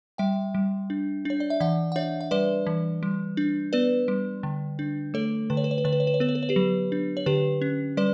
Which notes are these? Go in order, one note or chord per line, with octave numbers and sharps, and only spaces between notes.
G3 E5 G5
G3
D4
D4 C#5
D5
E5
E3 D5 F#5
F#5
D4 C#5 E5
E5
G3 B4 D5
E3
G3
D4
B3 B4 D5
G3
D3
D4
A3 A4 C#5
D3 B4
C#5
B4
C#5
B4
D3 C#5
B4
C#5
B4
C#5
B3 B4
C#5
B4
C#5
G4 B4
F#3
D4
C#5
D3 G4 B4
C#4
G3 B4 D5